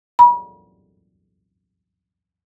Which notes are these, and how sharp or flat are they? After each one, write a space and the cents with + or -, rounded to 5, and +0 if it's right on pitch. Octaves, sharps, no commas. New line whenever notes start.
B5 -40